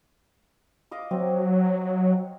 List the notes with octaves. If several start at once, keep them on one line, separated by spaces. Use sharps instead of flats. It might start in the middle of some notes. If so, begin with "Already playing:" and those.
D#5 F5 D6
F#3 C4